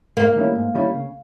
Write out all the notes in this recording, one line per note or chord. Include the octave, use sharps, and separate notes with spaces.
G#2 A#3
D#3 G3 C#4 E4
G#2
D#3 G3 C#4 E4
C#3